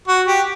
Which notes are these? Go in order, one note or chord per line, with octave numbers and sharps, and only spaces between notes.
F#4
G4